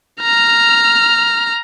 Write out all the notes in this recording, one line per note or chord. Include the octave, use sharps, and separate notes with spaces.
A#5 F6